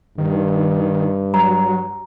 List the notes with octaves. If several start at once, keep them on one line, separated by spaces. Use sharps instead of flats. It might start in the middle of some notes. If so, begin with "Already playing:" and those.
G2 D#3
F#3 A#5